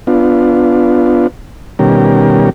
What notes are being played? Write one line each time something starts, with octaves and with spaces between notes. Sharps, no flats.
B3 D4 F4
B2 D#3 G3 C#4 G4 A#4